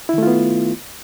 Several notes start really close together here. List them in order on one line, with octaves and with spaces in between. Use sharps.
E4 D#3 A3 F4 B3